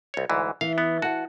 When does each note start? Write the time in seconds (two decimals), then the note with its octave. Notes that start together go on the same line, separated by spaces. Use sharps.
0.14 C2 C#5
0.30 D2 G#2 E3
0.61 E3 F5
0.78 B3
1.02 F#4 F#5 A5